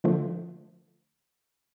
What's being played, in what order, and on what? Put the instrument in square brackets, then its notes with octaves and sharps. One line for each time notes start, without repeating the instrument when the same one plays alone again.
[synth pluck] D3 F3 A3